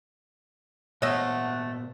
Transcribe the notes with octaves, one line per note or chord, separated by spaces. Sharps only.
A#2 A3 B3 C5 C#5 D#5 E5 F#5